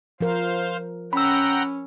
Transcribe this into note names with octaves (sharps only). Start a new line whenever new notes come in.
F3 A#4 C5 F5
C#4 F#5 G5 A#5 B5 E6